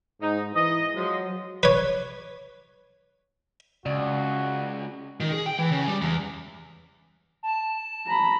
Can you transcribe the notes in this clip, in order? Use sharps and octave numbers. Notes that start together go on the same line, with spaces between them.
G#2 D#4
E3 D#5
F3 F#3 G#3 D#5
B4 C#5
C#2 C#3 F#4 D5
D#3
G#4
G5
E3
C#3
G3
E2
A5
A#5 B5